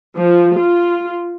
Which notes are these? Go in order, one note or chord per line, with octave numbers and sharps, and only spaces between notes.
F3
F4